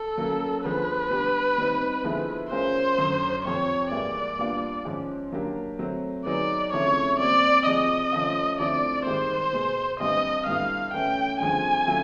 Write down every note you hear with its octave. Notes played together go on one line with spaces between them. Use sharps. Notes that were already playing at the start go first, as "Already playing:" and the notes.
Already playing: A4
F#3 A#3 C#4
D3 F3 G#3 B3 B4
G3 B3 D4 G4
G3 C4 D#4
D3 F3 G#3 B3 E4
E3 G#3 C#4 F4 A#4 C5
F#2 D3 F#3
F2 C3 F3 C#5
G#2 E3 G3 A#3 D5
A#2 G3 B3 D4 F4
G#2 F3 G#3 C#4
F#3 A#3 D4 G4 A#4
F#3 A3 C4
F#3 B3 D#4 G#4 B4 D5
C#3 F3 A3 C4 E4 C#5
A#2 G3 C4 D5
C3 F3 G#3 D#5
F3 A3 C#4 F4
D3 F3 A3 C4 E4 D5
G#2 D#3 G3 C5
B2 G#3 B3
G2 E3 G3 C4 D#5
G2 D3 G3 B3 E4 F5
E3 A3 C#4 G5
G2 D3 F3 G#3 C4 G#5
D3 F#3 A3 C#4 F4